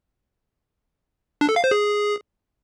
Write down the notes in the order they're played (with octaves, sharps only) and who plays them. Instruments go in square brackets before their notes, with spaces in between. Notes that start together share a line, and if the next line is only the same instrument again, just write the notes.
[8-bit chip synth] D4
A4
F5
C5
G#4